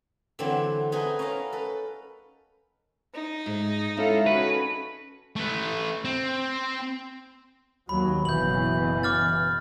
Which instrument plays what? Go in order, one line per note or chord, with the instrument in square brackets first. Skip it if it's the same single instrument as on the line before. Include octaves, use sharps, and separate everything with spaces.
[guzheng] D3 E3 F#3 C4 E4
B3 D#4 E4 G#4 B4
C#4 A#4 B4 F5 A#5
A4 B4
[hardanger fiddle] D#4
[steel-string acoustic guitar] G#2
[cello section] G#3 A4 F5 [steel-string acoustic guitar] C#4 E4 F4
[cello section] C#4 F#4 [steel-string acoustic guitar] A4 [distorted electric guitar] B4
[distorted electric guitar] A3 B4
C4
[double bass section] D#2 F#3 [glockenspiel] B5
[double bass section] F#1 B2 E3 [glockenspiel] G6 F#7
[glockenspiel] D6 F6 A6